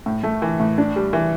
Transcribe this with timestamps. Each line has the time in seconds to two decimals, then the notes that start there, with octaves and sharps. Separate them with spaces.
0.06 A2
0.23 A3
0.42 E3
0.60 A2
0.78 D4
0.96 G3
1.13 E3